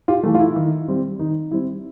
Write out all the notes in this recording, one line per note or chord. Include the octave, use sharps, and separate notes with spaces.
F4 G4
E3 A3
F4
E4
D#3
G3 C4
D#3 D#4
G3 C4 E4